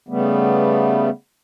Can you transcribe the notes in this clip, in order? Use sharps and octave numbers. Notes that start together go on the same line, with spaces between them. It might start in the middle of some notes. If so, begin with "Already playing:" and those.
C#3 G3 A3 B3